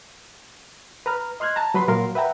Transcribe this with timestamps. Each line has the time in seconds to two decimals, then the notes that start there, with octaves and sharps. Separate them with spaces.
1.06 B4 A#5 F6
1.40 D#5 C6 F6 F#6 G#6
1.56 A5 A#5
1.74 F#3 B4 B5 C6
1.88 A#2 F#3 A#4 F5 C6
2.15 B4 E5 F#5 G5 A#5